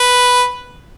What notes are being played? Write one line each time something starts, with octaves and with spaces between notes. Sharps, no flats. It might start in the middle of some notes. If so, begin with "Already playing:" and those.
Already playing: B4